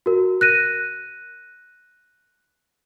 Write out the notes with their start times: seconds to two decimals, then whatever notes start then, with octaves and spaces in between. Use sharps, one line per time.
0.06 F#4 A#4
0.41 F#6 A#6 D#7